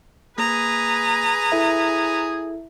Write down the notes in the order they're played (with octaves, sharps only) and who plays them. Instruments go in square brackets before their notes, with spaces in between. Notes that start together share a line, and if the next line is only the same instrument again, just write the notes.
[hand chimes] A#3 [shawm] G#4 [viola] B4 A#5
[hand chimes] E4 A4 E5